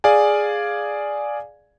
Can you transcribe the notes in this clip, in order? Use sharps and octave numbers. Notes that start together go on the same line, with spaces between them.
G#4 D5 F5 G#5